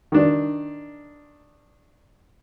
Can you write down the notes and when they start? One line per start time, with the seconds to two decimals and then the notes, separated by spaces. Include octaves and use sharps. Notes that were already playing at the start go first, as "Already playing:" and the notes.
0.12 D#3 D4